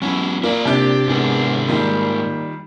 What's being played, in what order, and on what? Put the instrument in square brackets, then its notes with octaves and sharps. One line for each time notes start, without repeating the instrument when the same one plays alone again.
[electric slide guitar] F#3 B3 E4 [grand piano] C#4
[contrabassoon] A#2 [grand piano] A#3 [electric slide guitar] E4 D5
[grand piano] C3 D4 [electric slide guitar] G4
[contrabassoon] E2 [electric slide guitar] G#2 G#4 A#4
[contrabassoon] A#2 [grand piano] D#3 G3